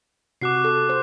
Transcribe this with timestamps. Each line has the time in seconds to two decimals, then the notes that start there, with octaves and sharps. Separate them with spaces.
0.41 C3 F#4 D6 F#6 C7
0.64 A4
0.89 C5